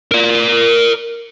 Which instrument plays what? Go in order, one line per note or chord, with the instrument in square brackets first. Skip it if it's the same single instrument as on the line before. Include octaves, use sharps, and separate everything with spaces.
[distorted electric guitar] A#4 D5